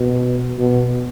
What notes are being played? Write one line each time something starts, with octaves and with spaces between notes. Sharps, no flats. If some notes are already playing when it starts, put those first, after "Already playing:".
Already playing: B2
B2